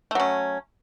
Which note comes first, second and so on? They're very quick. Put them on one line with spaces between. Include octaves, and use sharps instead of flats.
A3 F#3 C#4